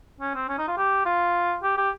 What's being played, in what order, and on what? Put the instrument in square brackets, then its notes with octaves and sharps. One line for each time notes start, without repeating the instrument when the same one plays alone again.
[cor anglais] C#4
C4
C#4
D#4
F4
G4
F4
G4
G4